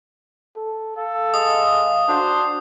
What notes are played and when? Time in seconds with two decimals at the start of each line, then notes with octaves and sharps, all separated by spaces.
0.56 A4
0.96 A4 F5
1.34 G#3 D#6
2.09 D4 F#4 C5